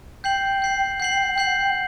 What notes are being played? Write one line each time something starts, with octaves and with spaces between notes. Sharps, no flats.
G5 G6 C7 F#7
G6 C7 F#7
F#5 G6 C7 F#7
G5
F#5
G5 G6 C7 F#7
F#5
G5
F#5